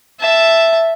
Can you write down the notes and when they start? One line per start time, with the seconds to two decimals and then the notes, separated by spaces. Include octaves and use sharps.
0.20 E5 A5